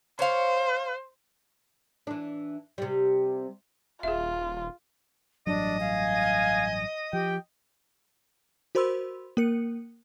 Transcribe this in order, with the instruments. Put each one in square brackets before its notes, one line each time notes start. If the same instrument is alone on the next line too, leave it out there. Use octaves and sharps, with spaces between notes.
[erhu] C5 [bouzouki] C#5 F5
[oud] E3 D4
C3 G3
[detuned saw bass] D#1 [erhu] F4 [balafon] G#4 E5
[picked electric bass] A1 G2 F#3 [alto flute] D4 [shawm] D#5
[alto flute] F5 [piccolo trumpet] G#5
[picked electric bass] F3 [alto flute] G4 [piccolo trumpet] G5
[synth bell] F#4 A#4 C5 B5 C6 E6
A#3 A#4 C#7